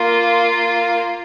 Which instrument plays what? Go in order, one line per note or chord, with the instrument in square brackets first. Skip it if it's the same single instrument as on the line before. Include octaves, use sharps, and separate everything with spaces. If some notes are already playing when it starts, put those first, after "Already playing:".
Already playing: [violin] A#3 [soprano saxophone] F4